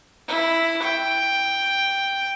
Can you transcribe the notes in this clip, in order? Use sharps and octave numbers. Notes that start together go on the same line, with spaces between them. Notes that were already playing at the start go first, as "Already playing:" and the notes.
E4
G5